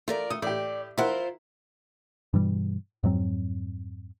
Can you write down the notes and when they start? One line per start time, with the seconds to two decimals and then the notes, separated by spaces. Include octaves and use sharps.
0.08 A3 F4 A#4 D5
0.30 A3 D#6
0.42 A2 G4 D5
0.98 E4 F4 A#4 C5 F#5
2.33 G2 B2 E3 G3
3.03 F2 G#2 F#3 C4